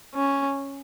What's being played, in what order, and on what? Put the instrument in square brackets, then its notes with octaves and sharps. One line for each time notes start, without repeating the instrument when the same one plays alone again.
[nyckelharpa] C#4